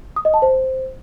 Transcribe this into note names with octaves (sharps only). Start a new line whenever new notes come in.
D#6
D#5
A5
C5